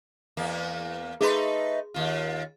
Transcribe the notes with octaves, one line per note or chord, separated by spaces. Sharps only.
E2 A#3
A3 D#4 G#4 B4 C6
D#2 F4